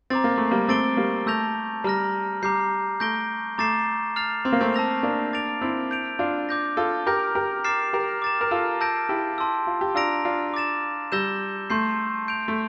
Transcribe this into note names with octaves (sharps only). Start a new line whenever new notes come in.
C4 A#5 D6 A6
A#3
A3
G3 A#3
A3 C4 D6 A6 D7 G7
G3 A#3
A3 A5 E6 G6 A#6 F7
G3 A#5 F6 A#6
G3 A#5 D6 G6 C7
A3 G6 A#6 D7 G7
A3 A#5 D6 A6 C7 E7
F6 A6 C7 F7
C4
A#3
A3 C4
A5 E6 A#6 F7
A#3 D4
D6 A6 D7 F7
C4 E4
G6 D7 F7
D4 F4
D6 G6 A#6
F4 A4
G4 A#4 D6 G6 A#6
G4 A#4
D6 F6 A6 C7 E7
G4 A#4
D6 A6 E7
A#4
F4 A4
A5 E6 G6 A#6 D7
E4 G4
A5 C6 E6
F4
G4
D4 F4 A#5 E6 A#6 D7 F7
D4 F4
D6 A6 E7
G3 E6 G6 A#6 E7 G7
A3 C6 G6 C7
G6 D7 F7
A3